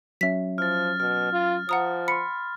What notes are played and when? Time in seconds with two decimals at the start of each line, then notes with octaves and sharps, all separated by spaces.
0.21 F#3 C#4 E5 B6
0.58 F3 F6 A6
1.00 B2 F6
1.32 F4
1.69 F3 F#5 A#5 D#6
2.08 B5 C6 C#7